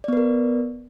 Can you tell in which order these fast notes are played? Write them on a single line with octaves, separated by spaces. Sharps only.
D5 B3 B4 A#4